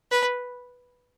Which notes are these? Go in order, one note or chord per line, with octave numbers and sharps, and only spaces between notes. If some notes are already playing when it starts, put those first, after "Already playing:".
B4